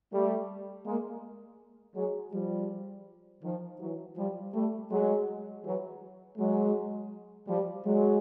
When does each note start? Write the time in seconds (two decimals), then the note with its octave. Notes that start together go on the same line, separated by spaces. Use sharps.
0.13 G3 A3
0.86 G#3 A#3
1.95 F#3 G#3
2.33 F3 G3
3.43 D#3 F3
3.80 E3 F#3
4.16 F3 G3
4.54 G3 A3
4.91 F#3 G#3
5.64 E3 F#3
6.37 F#3 G#3
7.48 F3 G3
7.85 F#3 G#3